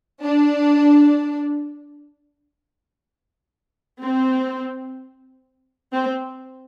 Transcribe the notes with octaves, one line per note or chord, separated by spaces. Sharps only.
D4
C4
C4